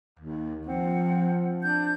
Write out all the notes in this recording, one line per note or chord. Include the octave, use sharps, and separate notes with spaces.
D#2
F3 C4 F#5
D4 G6